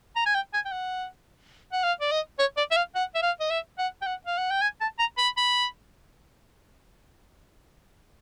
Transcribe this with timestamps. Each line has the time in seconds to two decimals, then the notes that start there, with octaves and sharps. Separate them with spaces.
0.16 A#5
0.26 G#5
0.34 G5
0.54 G#5
0.65 G5
0.72 F#5
1.73 F#5
1.84 F5
2.01 D5
2.12 D#5
2.39 C#5
2.57 D5
2.71 E5
2.76 F5
2.95 F#5
3.15 E5
3.22 F5
3.40 D#5
3.50 E5
3.79 F#5
4.02 G5
4.06 F#5
4.27 F5
4.38 F#5
4.51 G5
4.62 G#5
4.81 A5
4.99 A#5
5.18 B5
5.38 B5